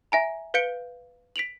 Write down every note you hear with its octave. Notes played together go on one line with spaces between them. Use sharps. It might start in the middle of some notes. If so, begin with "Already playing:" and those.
E5 G#5 A#5
B4 F5 G6 C#7 D7 G7
B6 D7 F7 F#7